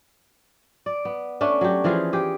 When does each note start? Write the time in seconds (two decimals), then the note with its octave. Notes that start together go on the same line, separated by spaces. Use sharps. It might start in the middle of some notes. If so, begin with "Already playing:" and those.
0.86 D5
1.05 B3
1.41 A3 C#4 D4
1.61 F#3 G4
1.84 E3 F3 F4 G#4
2.13 G4 G#4